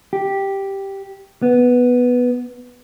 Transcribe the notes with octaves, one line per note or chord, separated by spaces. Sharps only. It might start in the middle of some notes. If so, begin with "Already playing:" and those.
G4
B3